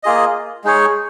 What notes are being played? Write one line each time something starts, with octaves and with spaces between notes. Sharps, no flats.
A#3 F4 G#4 D#5
G#3 D#4 G#4 C#5